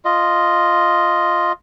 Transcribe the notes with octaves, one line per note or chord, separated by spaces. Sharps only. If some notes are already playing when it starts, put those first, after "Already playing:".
F4 D#5